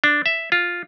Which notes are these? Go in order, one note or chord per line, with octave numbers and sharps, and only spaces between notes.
D4
E5
F4